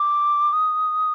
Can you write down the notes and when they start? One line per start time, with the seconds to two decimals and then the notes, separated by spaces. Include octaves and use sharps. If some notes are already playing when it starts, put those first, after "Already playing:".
Already playing: D6
0.53 D#6